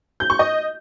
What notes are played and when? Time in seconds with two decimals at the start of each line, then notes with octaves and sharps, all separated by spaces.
0.20 G6
0.30 C#6
0.39 D#5